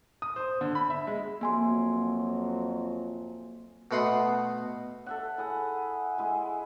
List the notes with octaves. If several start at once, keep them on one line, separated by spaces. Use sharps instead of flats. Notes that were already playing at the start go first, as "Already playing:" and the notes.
D#6
C5
D3
B5
E5
G#3
F2 F#3 A#3 G#5 C6
B2 A3 F#4 B5 C6 D#6
A4 E5 F#5
E4 G#4 F#5
G#3 E4 G#4